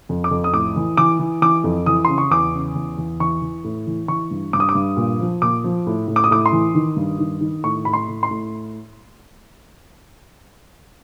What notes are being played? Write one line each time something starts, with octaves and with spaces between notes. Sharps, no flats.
F2
D6
F2
D#6
A2 D6
E3
E3 D6
E3
E3 D6
F2
E3 D#6
C#3 C6
C#6
E2 D6
C#3
E2
E2
E3 C#6
E3
A2
E3
E3 C#6
G2
G2 D6
D#6
D6
G2
A#2
F3
A#2 D6
F3
A2
A2
D6
D#6
A2 D6
C6
E3
D#3
G2
D#3
D#3
A2 C#6
A2 B5
C6
A2
C6
A2